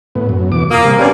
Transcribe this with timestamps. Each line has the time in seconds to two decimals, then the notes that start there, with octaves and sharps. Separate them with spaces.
0.15 A2 B3
0.29 F#2
0.52 E2 B2 D6
0.71 A#3 F4 D#6
0.84 C3 G3
0.99 G2 C4 C#4 G#5